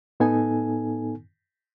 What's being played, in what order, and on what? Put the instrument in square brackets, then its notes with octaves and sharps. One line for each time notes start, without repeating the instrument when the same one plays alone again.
[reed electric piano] A2 B3 D#4 A4 G#5